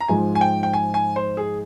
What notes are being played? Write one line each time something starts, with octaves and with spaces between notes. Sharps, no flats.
A#5
G#2 F3 G#3 G#5
G#5
G5
G5
G#5
G#5
C5
G#4